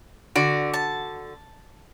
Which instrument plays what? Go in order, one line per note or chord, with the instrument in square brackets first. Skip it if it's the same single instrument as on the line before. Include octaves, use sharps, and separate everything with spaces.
[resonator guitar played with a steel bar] D3 F#4 [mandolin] D5
[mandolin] A5